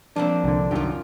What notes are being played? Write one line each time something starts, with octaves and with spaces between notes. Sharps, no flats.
F3 A#3 C4 D4
C2 D3
C2 F#2 D#3 F4 G4